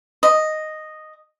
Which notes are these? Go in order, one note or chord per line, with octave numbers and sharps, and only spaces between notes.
D#5